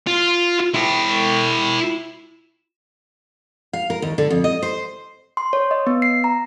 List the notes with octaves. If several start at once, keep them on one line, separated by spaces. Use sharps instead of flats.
F4
E4 G5
F5
A#4
D#2
D3
F2
D#5
C5
C6
C#5
D#5
B3
C7
A#5